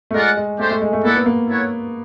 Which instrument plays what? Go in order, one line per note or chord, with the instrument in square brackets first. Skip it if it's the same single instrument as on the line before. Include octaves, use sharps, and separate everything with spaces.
[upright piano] A3
[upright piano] G#3 [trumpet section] F4 A#4 D5 F#5
[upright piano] G#3
[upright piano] A3 [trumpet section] D4 G4 C5
[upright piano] A3
G#3
A3
[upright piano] A#3 [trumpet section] E4 A4 D5 F#5
[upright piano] B3
A#3
[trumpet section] E4 A4 C#5 F#5